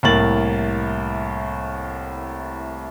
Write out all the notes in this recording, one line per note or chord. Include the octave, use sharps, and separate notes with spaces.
C2 A2 A#3 A6 F#7